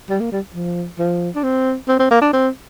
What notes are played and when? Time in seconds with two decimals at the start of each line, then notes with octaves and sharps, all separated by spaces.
0.10 G3
0.20 A#3
0.32 G3
0.54 F3
0.99 F3
1.35 D4
1.43 C4
1.88 C4
1.99 C4
2.11 A#3
2.22 D4
2.33 C4